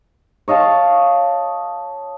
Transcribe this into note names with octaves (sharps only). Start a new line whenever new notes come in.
C#5 D#5 F5 A5